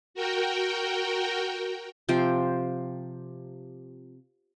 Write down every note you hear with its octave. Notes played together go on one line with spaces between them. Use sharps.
F#4 A#4 G5
C3 F3 C5 G5